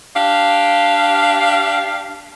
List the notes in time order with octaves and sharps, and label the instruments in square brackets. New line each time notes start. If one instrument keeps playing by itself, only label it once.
[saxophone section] D4 G4 F5